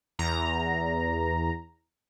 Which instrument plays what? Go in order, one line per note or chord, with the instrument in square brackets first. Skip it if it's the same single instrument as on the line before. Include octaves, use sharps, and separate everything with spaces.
[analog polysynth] E2 A#5